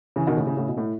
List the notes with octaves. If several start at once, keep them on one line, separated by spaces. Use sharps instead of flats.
C#3 E3
B2 D#3
A2 C#3
A2 C#3
A2 C#3
B2
A2